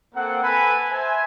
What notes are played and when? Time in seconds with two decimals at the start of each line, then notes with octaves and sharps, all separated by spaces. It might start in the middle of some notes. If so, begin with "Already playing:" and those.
0.14 A#3 C4 A4 F#5
0.42 A4 B4 F#5 G#5 A#5 B5
0.89 C5 E5 G#5